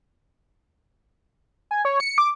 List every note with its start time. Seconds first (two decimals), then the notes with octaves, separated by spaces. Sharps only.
1.71 G#5
1.85 C#5
2.00 C#7
2.18 D6